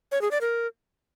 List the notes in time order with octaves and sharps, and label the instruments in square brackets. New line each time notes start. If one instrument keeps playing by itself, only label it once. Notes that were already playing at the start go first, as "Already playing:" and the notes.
[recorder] C#5
G#4
D5
A#4